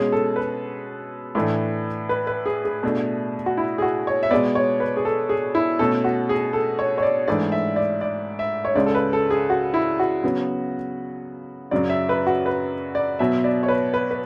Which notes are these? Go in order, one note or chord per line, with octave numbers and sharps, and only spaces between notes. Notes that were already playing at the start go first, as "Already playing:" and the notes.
Already playing: B2 G#3 C#4 G#4
A4
B4
A2 E3 A3 D4
B4
B4
G#4
G#4
B2 A3 D4
F#4
E4
G#4
F#4
C#5
E5
B2 G#3 B3 D5
C#5
B4
G#4
A4
G#4
E4
B2 A3 C#4 A4
F#4
G#4
A4
C#5
C#5
D5
G#2 E3 A3 D4 D5
E5
D5
D5
E5
C#5
C#2 C#3 G#3 D5
A4
B4
A4
G#4
F#4
E4
F#4
C#3 F#3 B3
F#2 C#3 F#3 D5
E5
B4
F#4
B4
D5
B2 F#3 B3 E5
D5
C#5
B4
B4
B4